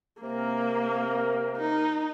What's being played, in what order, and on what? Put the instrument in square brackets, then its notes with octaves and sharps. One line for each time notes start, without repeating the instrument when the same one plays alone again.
[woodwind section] C3 C4 A#4 [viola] A#3
[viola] D#4